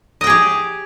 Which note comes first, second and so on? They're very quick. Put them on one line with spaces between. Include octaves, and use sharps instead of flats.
D#5 G5 G#4 G4